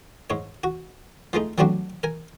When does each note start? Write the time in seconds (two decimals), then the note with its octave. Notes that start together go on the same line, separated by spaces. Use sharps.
0.30 G#2 C#5
0.64 F#4
1.33 F3 G#3 A3 D#4
1.58 F#3 G3 A3 C4 D4 F#4
2.03 A#4 G#5